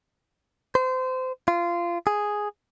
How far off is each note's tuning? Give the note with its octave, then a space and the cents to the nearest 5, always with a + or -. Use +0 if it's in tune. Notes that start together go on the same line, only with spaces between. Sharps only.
C5 -25
F4 -20
G#4 +0